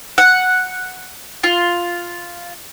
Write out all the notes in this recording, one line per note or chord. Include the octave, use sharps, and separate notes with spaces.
F#5
F4